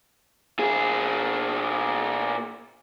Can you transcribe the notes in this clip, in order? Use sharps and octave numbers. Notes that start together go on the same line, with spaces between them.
A#2 G#4